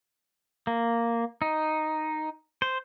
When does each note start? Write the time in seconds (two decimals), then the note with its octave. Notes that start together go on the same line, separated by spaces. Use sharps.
0.67 A#3
1.42 D#4
2.62 C5